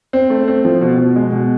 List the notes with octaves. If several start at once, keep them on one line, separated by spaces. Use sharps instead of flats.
C4
A3
C4
F3
B2
B2
G#3
B2